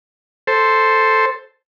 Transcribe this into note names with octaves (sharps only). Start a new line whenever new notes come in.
A4 C5